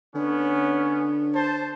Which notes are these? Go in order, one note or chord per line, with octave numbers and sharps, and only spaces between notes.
D3 B3 C#4
C5 A5